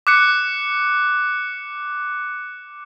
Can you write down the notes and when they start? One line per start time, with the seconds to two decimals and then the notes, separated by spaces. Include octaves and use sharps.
0.07 D6 F#6 C#7